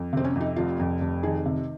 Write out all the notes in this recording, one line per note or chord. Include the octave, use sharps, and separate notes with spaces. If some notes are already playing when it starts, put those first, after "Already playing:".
Already playing: F2
C3 C4
C#4
F2
D#4
F1 F4
F2
F1
D#3 G#4
C3